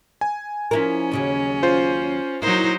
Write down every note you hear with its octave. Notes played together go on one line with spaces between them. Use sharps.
G#5
F3 C#4 E4 A#4
D#2 C#3 F#3
F4 C5
F#3 A#3 D#4 E4 C5